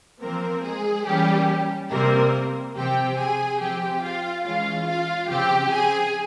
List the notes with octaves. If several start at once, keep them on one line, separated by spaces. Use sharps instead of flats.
F3 A#3 C4 A#4
G#3 G#4
E3 G3 A#3 C#4 G4
C3 G3 A#3 C4 A#4
C3 F3 C4 G4 G5
G#4 G#5
F3 C4 G4 G5
F4 F5
E3 G#3 C#4 F4 F5
F4 F5
C#3 F3 C4 G4 G5
G#4 G#5